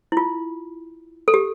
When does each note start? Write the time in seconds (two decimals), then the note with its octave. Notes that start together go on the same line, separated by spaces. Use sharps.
0.12 E4
0.17 F4
1.28 A4
1.34 G4